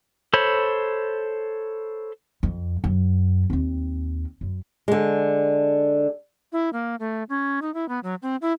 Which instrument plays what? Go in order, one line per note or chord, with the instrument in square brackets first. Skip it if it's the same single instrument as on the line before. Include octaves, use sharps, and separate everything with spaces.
[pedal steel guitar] A4 C5 C#5 B5
[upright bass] F2
F#2
D#2 C4
F#2
[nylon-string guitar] D3 G#3
[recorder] E4
A#3
A3
C#4
D#4
E4
B3
F#3
C4
E4